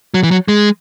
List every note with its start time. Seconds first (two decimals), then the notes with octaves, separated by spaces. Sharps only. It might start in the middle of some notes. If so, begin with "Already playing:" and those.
0.14 F#3
0.23 E3
0.31 F#3
0.48 G#3